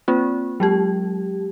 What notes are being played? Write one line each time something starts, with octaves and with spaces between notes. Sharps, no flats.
A#3 C4 F4
F#3 G#3 G4